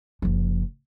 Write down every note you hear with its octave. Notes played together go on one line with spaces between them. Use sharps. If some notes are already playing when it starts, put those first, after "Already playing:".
F#1 F3